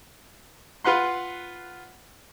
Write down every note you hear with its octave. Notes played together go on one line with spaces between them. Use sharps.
F4 B4 F#5 C6